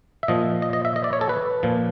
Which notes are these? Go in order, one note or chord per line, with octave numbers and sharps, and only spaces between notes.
E5
A#2 F3 D#5
D#5
D#5
E5
D#5
D5
C#5
A4
B4
A#2 F3